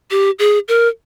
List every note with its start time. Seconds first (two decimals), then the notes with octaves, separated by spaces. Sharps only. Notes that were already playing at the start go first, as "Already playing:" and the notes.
0.11 G4
0.39 G#4
0.68 A#4